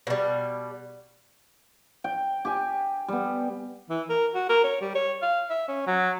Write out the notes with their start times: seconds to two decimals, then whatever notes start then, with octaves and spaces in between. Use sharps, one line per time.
0.07 B2 G3
2.04 G5
2.45 G4 G#5
3.08 G3 B3
3.90 E3
4.10 A#4
4.35 F#4
4.49 A#4
4.64 C#5
4.81 G3
4.95 C#5
5.22 F5
5.50 E5
5.68 C#4
5.87 F#3